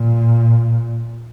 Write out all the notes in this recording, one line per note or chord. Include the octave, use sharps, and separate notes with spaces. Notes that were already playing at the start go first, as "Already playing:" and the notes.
Already playing: A#2